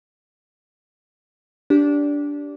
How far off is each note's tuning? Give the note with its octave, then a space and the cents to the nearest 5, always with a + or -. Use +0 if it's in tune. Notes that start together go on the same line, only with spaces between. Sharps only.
D4 -15 G4 +0